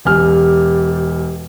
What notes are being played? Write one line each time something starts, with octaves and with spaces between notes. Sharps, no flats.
E1 G4 G#5 F6